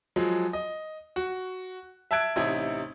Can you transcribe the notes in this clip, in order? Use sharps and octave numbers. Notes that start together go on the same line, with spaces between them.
F3 F#3 G#3
D#5
F#4
E5 A5 E6 F#6 G#6 D7
A1 C3 D#4 E4 G#6